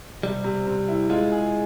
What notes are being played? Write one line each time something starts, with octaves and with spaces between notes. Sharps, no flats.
C3 G3
C3
C3
E4
G#3 F4
G#4